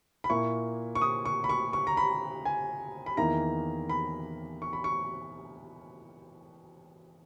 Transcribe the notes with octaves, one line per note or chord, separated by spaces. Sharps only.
B5
A#2 A#3 E4 C#6
C#6
D#6
C#6
B5
C#6
C#6
A#5
B5
G#5
B5
E2 D#3 A#3 E4 A#5
B5
C#6
B5
C#6